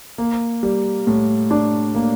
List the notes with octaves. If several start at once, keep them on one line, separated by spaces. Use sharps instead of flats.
A#3
G3
A2
D4
A#3